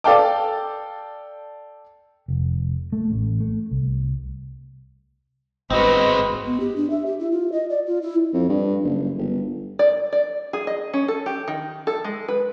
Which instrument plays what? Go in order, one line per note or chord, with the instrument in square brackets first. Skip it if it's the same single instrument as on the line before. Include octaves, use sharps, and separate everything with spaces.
[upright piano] A4 D5 F5 G5 A5 D6
[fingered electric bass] F1
A3
A1
A3
C2
[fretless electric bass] G1 [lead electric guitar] G#3 C4 [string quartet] F#4 B4 [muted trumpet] D#5
[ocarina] B3
G4
D4
E5
G4
E4
F4
D#5
D5
F4
E4
[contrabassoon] F2
G2
F#1
G1
[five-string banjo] D5
D5
G#4
D#5
C#4
A4
G4
D#3
A4
G#3
B4